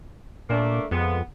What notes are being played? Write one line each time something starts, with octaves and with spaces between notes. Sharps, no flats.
A#2 A3 A#3 D4
F2 G#3 B3